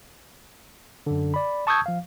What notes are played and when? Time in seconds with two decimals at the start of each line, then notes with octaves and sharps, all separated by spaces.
1.07 F#2 D3
1.34 D5 B5
1.67 A5 C#6 D#6 E6 G6 G#6
1.86 F3 F5